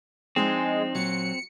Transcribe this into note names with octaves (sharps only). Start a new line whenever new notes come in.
F3 G#3 C4 D4 D#4
A#2 F#3 C#7